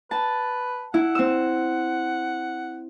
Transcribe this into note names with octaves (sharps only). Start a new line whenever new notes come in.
B4 A5
E4 F#5
C4 E6